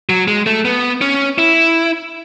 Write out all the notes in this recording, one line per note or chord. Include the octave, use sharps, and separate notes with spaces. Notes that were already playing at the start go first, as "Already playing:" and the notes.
F#3
G#3
A3
B3
C#4
E4